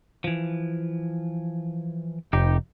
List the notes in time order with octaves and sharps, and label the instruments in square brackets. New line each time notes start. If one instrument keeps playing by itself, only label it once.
[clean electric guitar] E3 F3
[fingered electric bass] F1 [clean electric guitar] D#4 G4